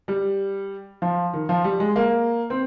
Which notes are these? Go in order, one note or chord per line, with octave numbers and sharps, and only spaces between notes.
G3
F3
D#3
F3
G3
G#3
A#3
C4